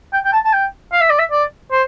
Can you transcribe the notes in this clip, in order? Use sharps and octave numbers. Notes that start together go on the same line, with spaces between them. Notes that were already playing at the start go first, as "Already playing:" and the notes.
G5
G5
A5
A5
G5
F5
E5
D5
E5
D5
C5